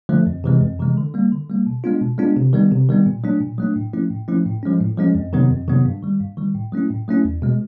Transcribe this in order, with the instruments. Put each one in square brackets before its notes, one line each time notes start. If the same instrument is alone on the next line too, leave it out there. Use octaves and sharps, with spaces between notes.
[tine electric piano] D3 F3 A3
F2
C3 E3 G#3
F2
C3 E3 G#3
D3
G3 A#3
D3
G3 A#3
B2
G#3 B3 D4 F4
B2
G#3 B3 D4 F4
C3
D#3 G3 B3
C3
D#3 G3 B3
A#2
F#3 A3 D4
A#2
F#3 A3 D4
A2
F3 A3 C#4 E4
A2
F3 A3 C#4 E4
A2
F3 G#3 C#4
A2
F3 G#3 C#4
F2
C3 D#3 F#3 B3
F2
C3 D#3 F#3 B3
G2
D#3 G3
G2
D#3 G3
A2
F#3 A3 C#4 E4
A2
F#3 A3 C#4 E4
E2
B2 G#3